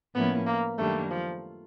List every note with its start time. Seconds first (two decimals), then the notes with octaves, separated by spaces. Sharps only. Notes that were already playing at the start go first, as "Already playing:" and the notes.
0.15 A2 F3 A#3 B3 C#4 E4
0.46 A#3
0.78 F#2 D#3 G3 A3 A#3 D4
1.11 F3